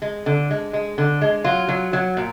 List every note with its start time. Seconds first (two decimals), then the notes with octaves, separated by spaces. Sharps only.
0.02 G#3
0.26 D3
0.50 G#3
0.73 G#3
0.98 D3
1.21 G#3
1.44 F#3 F4
1.69 F#3
1.93 F#3
2.17 A#2